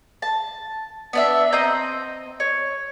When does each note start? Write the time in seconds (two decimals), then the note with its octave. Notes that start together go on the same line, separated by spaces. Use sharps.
0.22 A5
1.13 B3 D4 E5
1.53 C4 D#5 A#5 G6
2.40 C#5